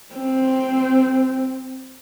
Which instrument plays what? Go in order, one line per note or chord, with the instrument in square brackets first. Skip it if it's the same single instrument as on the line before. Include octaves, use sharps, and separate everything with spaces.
[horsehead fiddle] C4